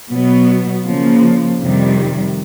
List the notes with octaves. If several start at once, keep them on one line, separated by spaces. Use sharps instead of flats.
B2 F#3 B3
C#3 F3 A#3
F2 C3 D#3 G3